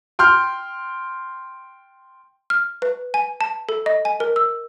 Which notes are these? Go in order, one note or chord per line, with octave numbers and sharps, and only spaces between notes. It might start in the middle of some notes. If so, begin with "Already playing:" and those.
G5 C6 F6 G6
F6
B4
G#5
A5
A4
D#5
G#5
A#4
E6